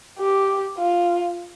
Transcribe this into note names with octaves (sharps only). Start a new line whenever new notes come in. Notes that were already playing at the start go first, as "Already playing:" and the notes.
G4
F4